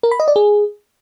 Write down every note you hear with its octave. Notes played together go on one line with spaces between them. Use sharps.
A#4
B5
D#5
D5
G#4